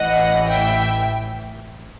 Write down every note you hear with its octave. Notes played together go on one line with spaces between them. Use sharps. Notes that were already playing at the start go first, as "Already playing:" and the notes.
Already playing: A1 A2 E3 D#5 F#5
E5 G5